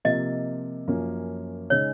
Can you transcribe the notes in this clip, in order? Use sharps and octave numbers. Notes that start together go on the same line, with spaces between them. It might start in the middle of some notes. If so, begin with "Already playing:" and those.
C3 F3 A#3 D#5
F#2 F3 A#3 C#4
C#3 G#3 D#4 C#5